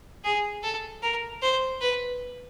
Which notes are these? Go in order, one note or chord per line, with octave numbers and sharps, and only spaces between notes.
G#4
A4
A#4
C5
B4